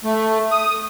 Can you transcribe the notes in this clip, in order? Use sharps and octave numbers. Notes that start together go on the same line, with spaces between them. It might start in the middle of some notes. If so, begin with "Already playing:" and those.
A3
D#6